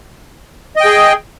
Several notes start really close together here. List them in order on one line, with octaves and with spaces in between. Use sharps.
D#5 G5 G#4